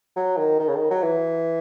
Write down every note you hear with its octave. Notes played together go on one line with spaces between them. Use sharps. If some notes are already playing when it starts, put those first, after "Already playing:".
F#3
D#3
D#3
C#3
D#3
F#3
E3